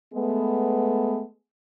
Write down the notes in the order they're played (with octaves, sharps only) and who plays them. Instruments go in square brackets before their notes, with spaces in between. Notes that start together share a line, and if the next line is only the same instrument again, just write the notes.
[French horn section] G#3 A3 B3